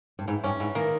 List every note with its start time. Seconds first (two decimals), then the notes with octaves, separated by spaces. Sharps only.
0.19 G2
0.28 G#2 E3
0.44 G2 C#4
0.60 G#2 E3
0.75 D#3 A#3